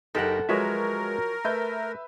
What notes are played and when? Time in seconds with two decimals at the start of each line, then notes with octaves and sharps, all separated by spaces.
0.15 F#1 D#4 G4 A4 A#4 F#5
0.49 F3 F#3 G#3 A#4 B4 C#5 E5
1.45 A3 B4 E5 G6